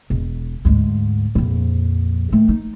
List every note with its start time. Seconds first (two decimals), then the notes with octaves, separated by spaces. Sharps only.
0.10 E1
0.65 D2 G#2
1.35 A#1 F2
2.33 D#3 A3
2.49 D#4